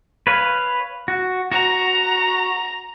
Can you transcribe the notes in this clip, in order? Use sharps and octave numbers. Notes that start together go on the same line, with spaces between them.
B4 C#5 F5
F#4
F#4 A#5